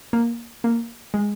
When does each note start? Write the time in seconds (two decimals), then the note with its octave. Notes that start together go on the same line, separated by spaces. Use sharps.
0.13 A#3
0.64 A#3
1.14 G#3